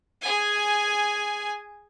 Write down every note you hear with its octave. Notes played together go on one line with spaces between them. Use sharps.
G#4 G#5